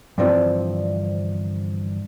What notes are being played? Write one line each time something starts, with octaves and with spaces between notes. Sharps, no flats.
G2 D3 E3 F3 C4